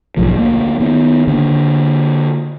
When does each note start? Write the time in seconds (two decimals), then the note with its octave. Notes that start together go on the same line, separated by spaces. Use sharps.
0.17 B1 G#2 F3 G#3
0.35 D2 A#3
0.80 D#3 B3
1.27 D3 A#3